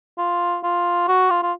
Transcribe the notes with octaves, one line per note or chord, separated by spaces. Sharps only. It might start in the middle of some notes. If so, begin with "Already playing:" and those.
F4
F4
F#4
F4
F4